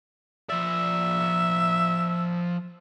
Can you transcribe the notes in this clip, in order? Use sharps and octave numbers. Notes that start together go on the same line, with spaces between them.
F3 D5 E5